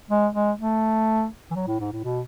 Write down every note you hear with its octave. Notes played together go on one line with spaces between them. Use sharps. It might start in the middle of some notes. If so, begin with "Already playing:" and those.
G#3
G#3
A3
E3
F#3
A2
G#2
A2
B2